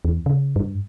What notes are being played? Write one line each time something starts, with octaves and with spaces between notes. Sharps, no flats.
E2
C#3
G2